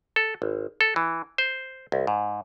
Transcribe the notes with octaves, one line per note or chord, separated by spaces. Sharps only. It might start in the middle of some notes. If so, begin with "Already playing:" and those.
A4
G#1
A4
E3
C5
C2
G#2